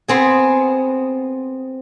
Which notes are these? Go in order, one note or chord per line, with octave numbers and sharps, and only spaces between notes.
B3 C4 G#4